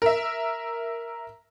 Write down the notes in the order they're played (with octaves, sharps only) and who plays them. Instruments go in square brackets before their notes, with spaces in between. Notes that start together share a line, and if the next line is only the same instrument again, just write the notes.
[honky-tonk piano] A#4 E5